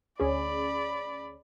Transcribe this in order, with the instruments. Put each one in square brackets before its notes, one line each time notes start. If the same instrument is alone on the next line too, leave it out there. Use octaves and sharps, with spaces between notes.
[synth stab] D2 C#4 G#4 [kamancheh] D5 B5